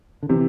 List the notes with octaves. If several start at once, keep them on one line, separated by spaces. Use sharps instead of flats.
D3
C3 E3